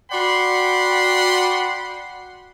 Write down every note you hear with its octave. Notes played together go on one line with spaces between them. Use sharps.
F#4 D5 F#5 G5 B5 C6